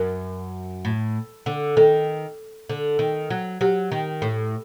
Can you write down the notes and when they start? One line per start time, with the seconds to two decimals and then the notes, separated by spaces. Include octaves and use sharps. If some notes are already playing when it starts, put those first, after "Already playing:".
Already playing: F#2 A#4
0.85 A2
1.46 D3
1.77 D#3 A4
2.70 D3
2.99 D#3
3.30 F#3
3.61 F#3 G4
3.92 D#3
4.22 A2